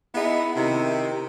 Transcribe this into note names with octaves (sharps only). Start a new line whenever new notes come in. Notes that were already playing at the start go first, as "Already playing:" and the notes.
B3 D#4 E4 G#4
C3 D#3 E4